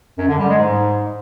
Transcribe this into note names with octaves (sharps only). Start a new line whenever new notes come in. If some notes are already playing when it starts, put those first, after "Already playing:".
F#2
D3
G3
G#3
G#2